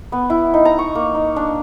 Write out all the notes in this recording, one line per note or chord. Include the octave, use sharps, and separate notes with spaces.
B3
E4
D#4
A#5
C#6
A#3
D#4
D4